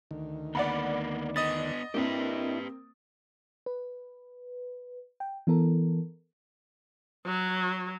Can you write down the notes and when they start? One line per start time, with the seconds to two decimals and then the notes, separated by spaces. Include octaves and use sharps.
0.11 D2 D#3
0.55 A#3 B3 D5 F#5 B5
1.36 B3 D4 D#5 D#6 A6
1.94 A#3 C4 D4 E4 G4 B4
3.66 B4
5.20 G5
5.47 E3 B3 A4 A#4
7.26 F#3